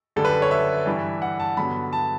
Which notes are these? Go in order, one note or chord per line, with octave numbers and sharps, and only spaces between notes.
F#2 D3 G3 A4
B4
C#5
E5
G2 E3 G3
F#5
A5
G2 D3 F#3 B3 B5
A5